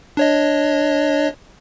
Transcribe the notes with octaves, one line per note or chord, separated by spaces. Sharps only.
D4 C#5 D#5